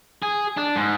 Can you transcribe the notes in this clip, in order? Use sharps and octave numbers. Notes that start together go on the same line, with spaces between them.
G#4
D4
G#2